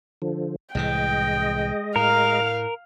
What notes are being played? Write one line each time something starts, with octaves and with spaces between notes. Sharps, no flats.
D3 F3
C2 A2 E3 G#3 D#5 G5
A2 A#4 F5